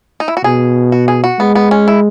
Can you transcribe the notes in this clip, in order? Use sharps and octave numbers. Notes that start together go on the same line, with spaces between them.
D#4
E4
F#4
B2 G#4
F#4
G#4
F#4
G#3 B3
B3
C#4
E4